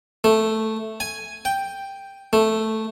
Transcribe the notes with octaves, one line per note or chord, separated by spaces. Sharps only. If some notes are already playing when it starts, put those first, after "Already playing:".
A3
G#5
G5
A3